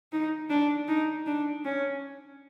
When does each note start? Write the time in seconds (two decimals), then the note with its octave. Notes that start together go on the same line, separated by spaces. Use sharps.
0.12 D#4
0.50 D4
0.88 D#4
1.27 D4
1.65 C#4